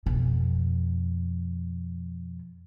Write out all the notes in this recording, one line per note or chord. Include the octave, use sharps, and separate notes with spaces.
F2 B2